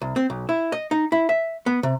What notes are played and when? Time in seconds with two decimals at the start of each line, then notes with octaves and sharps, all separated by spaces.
0.01 C2
0.16 C4
0.30 B1
0.49 E4
0.72 D#5
0.91 D#4
1.12 E4
1.29 E5
1.66 B3
1.83 C3